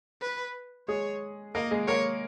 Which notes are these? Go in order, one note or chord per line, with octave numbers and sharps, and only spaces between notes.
B4
G#3 G#4 C#5
A#3 A#4 D#5
G#3 G#4
A#3 A#4 C#5